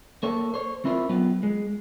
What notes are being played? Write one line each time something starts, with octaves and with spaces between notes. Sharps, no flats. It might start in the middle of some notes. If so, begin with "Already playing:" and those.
A#3 A4 C#5
C5 C#5
C4 E4 F4 A#4 C5
F#3 B3 F4
G#3